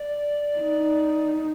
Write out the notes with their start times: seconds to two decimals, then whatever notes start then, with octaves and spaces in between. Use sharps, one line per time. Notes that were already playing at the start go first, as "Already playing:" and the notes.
Already playing: D5
0.59 D#4